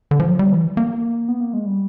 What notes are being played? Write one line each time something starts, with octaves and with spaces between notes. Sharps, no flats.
D3
F3
F#3
G3
E3
A#3
B3
A#3
G#3
G3